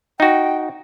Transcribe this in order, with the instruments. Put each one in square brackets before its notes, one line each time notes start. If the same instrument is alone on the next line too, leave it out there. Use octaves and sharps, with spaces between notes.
[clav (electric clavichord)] D#4 F#4 [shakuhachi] G5